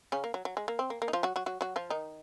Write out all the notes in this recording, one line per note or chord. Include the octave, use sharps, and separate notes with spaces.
C#3 C#4
A#3
F#3
F#3
G#3
A#3
C4
A#3
A#3
D#4
F3 F4
F#3 F#4
F#3 F#4
F#3 F#4
F#3 F#4
F3 F4
D#3 D#4